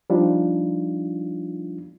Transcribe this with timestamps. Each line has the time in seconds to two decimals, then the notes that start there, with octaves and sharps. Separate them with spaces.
0.10 F3 G3 D4 D#4 F4